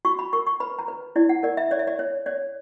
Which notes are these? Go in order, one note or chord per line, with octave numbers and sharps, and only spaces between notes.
F#4 C#6
B5
A#4 C#6
C#6
B4 B5
A#5
B4
E4 D5
F#5
A#4 D5
E5
C#5 D5
E5
D5
C#5
C#5 D5